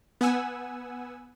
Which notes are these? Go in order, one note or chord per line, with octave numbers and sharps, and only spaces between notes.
B3 F#5 G#5 E6